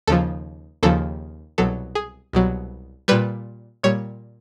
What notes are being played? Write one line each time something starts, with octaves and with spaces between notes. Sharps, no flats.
D#2 C#3 F3 A4
D#2 C#3 F3 A4
C2 B2 F#3 A4
G#4
C2 B2 F#3
A#2 G3 B4
A#2 G3 C#5